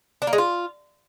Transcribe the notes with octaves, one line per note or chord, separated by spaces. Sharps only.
D4
A#3
G#3
F4